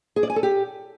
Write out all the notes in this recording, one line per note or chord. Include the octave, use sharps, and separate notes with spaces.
G#4
D5
G#5
A4
G4